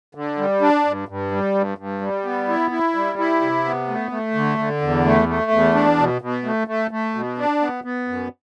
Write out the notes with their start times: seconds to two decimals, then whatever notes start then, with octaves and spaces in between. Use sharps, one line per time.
0.15 D3
0.38 G3
0.61 D4
0.85 G2
1.09 G2
1.31 G3
1.55 G2
1.78 G2
2.01 G3
2.25 B3
2.48 E4
2.71 E4
2.95 G3
3.18 E4
3.41 C3
3.65 B3
3.88 A3
4.11 A3
4.35 D3
4.58 D3
4.81 E2
5.05 A3
5.28 A3
5.51 E2
5.74 D4
5.98 B2
6.21 B2
6.44 A3
6.67 A3
6.91 A3
7.15 B2
7.38 D4
7.61 B3
7.84 B3
8.08 F#2